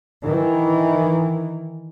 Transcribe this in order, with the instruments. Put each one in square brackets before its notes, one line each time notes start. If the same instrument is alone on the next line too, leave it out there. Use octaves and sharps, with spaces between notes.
[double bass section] D#3 E3